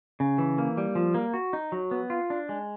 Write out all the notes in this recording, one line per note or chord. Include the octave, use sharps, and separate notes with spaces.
C#3
E3
A#3
G3
F3
A#3
F#4
D#4
F#3
B3
F4
D4
G#3